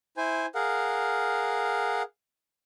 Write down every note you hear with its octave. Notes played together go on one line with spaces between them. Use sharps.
E4 C5 G#5
G#4 A#4 F5 F#5